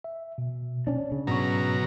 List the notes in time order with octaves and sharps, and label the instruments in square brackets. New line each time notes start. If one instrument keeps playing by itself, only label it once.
[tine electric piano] E5
B2
[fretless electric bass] C#4 D4
C#3
[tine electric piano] G#2 C#6 [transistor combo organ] B2 F#3 A#5